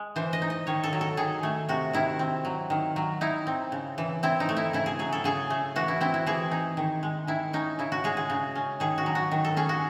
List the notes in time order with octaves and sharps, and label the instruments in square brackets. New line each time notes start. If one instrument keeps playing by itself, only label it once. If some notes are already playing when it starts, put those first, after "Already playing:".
Already playing: [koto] G#3
E3 C5
D#5
D#4
D#5
D#3 C#5
A4
F#3
A4
D#3 G#4
A3
C3 F#4
D#3 E4
C4
F#3
D#3
F#3
D#4 E4
C4
C#3
E3
C4 E4
D#4
A3
E4
C#3 E4
G#4
F#3 G#4
A4
C#3 G#4
A3
E3 F#4
E4
C4 E4
E4
E3 G#4
D#4
D#3
G#3
D#3 E4
C#4 D#4
C#3 E4
F#4
G#3 G#4
G#4
C#3
C#4
D#3 G#4
F#4
F#3
F#4
D#3
A4
C#4 G#4
F#4